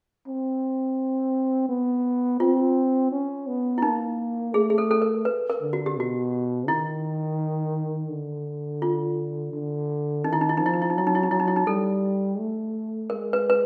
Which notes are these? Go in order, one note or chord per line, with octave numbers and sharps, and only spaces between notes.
C4
B3
C4 F4
C#4
B3
E4
A#3 D#4
A3 G#4
G#4
A4
A4
A#4
B4
A#4
D3
F#4
G4
B2 F#4
D#3 E4
D3
F4
D3
D#3 D#4
E4
D#4
E4
F3 D#4
E4
D#4
E4
D#4
F#3 E4
D#4
E4
D#4
F#3 E4
D#4
E4
D#4
G3 A4
A3
G#3 A#4
B4
B4